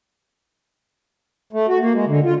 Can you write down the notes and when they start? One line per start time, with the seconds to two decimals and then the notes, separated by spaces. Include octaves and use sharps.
1.53 A3
1.68 F#4
1.80 A#3
1.94 G#3
2.06 D3
2.24 F4